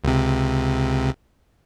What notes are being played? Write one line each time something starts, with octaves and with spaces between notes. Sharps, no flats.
C#2 C3